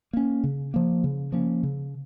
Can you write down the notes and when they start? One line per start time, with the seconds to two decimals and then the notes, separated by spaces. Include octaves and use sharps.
0.13 A#3 C#4
0.44 C#3
0.74 F3 A#3
1.04 C#3
1.32 F3 A#3 C#4
1.63 C#3